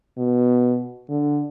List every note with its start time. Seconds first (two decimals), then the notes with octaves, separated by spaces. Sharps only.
0.18 B2
1.09 D3